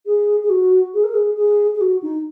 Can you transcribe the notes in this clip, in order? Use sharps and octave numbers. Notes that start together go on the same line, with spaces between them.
G#4
G#4
F#4
G#4
A#4
G#4
G#4
G#4
F#4
D#4